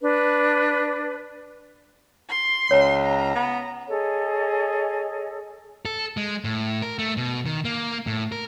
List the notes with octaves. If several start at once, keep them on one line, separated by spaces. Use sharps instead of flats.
D4 B4
C6
C#2 C#5
A#5
B3
G#4 A4 C#5 D#5
A4
G#3
A2
A#4
A3
B2
D#3
A#3
A2
A#4